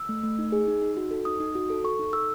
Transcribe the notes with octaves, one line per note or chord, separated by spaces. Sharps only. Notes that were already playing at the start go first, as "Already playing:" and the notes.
Already playing: E6
A3
A3
D#4
G#4
D#4
D#4
F#4
A4
D#4 D#6
D#4
F#4
A4
A4 C#6
D#4
A4 E6